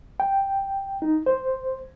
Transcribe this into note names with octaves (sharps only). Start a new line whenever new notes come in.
G5
D#4
C5